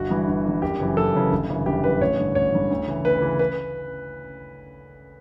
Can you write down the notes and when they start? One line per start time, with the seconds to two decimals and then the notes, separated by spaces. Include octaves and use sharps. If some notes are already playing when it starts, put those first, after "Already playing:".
Already playing: G1 F#4
0.10 G2 E3
0.28 G1
0.45 G2 E3
0.62 F#1 G4
0.80 F#2 C#3 E3
0.97 F#1 A4
1.14 F#2 C#3 E3
1.32 G1
1.49 F#2 C#3 E3
1.66 G1 G4
1.84 F#2 C#3 E3 B4
2.01 A1 C#5
2.19 G2 D3
2.35 A1 C#5
2.54 G2 D3
2.71 D2
2.87 C#3 E3
3.05 D2 B4
3.22 C#3 E3
3.39 B4